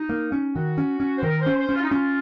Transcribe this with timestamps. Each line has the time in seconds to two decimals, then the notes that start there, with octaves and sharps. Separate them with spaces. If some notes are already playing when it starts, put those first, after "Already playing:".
Already playing: D#4
0.09 A#3
0.32 C#4
0.55 D#3 F#4
0.78 C#4
1.00 C#4
1.18 C5
1.23 D#3 A#4
1.40 C5
1.46 C#4
1.58 C5
1.69 C#4
1.75 F4
1.82 D#4
1.89 C#4 F4